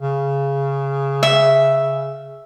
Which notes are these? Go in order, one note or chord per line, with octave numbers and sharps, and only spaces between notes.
C#3
E5